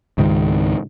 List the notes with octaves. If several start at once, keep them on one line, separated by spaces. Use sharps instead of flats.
C#2 G#2 D#3